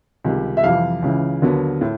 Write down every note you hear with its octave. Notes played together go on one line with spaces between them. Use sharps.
C#2 C3 D#3 G3
E5
F2 C3 E3 G3 F5
C#2 C#3 E3
D#2 D3 F#3 B3
A2